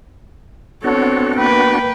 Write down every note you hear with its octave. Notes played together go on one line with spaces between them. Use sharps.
B3 C4 D4 F#4 A4 C#5
A#3 B4 G5